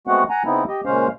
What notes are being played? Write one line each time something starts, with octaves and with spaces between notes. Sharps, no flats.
G#3 A3 B3 C4 F#4 F#5
F#5 G#5 A#5
C#3 B3 C4 D#4 E4
G4 D#5
A#2 C#3 G#3 C#4 C5 F5